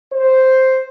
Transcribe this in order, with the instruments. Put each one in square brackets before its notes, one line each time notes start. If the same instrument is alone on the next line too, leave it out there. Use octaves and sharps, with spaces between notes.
[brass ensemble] C5